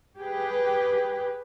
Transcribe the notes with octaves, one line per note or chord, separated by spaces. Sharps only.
G4 G#4 B4